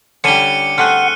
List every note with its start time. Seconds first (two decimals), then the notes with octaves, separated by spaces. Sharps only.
0.24 D3 G3 C#4 D4 E4 C#7 D#7 G7
0.78 A3 C4 G#4 F#5 F6 F#6